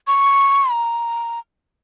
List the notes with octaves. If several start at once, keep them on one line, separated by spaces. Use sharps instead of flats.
C#6
A#5